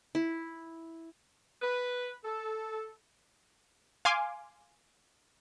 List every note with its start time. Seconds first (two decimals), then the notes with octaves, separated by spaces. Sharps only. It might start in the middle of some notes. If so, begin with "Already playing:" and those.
0.15 E4
1.62 B4
2.24 A4
4.05 F5 G#5 C6 D6